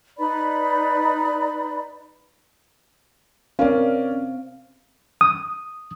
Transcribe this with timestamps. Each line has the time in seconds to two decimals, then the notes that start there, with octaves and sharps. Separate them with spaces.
0.18 D#4 B4 D5 B5
3.59 C4 C#4 A#4 D5 F5
5.21 D#6